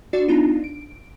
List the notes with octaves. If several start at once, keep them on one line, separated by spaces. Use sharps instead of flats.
D4 F#4 D5
B3 D4 D#4 F4
D7